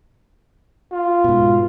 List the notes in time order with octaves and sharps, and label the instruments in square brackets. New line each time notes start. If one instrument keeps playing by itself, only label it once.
[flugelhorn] F4
[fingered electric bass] G#2 B2